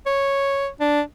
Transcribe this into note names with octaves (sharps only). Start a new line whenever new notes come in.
C#5
D4